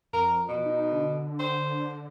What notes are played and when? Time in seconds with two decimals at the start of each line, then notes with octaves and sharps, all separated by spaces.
0.13 F2 A#4
0.48 B2
0.65 D#4
0.92 D3
1.39 C5